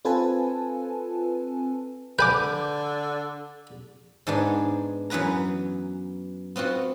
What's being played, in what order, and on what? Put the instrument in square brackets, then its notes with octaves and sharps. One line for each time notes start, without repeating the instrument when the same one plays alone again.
[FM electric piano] C4 F4 A4 B4 G#5 A5
[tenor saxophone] D3 [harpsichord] B4 G#5 D6 [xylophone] G6
[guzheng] G#2 G#3 B3 D4
F#2 E3 B3 B4 A#5
B3 C4 F4 F#4